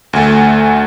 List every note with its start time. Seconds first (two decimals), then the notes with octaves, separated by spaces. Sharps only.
0.13 D2 A3